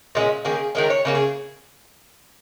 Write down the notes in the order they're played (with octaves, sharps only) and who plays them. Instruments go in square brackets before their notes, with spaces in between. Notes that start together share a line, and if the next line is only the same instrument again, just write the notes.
[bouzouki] A#2 G#3 C#4
D#3 A#3 C#4 G#4
D#3 G#3 C#4 A#4
C#5
C#3 A#3 C#4 C#5
G#4